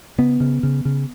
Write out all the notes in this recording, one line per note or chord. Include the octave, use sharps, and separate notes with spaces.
C#3 B3
C#3
C#3
C#3